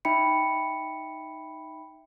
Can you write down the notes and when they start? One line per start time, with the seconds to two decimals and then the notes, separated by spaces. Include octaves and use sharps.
0.05 D#4 E5 G5 B5 C#7